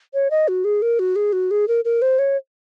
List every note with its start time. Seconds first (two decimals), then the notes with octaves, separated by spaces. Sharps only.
0.14 C#5
0.30 D#5
0.48 F#4
0.65 G#4
0.82 A#4
0.99 F#4
1.16 G#4
1.33 F#4
1.51 G#4
1.68 A#4
1.85 A#4
2.02 C5
2.19 C#5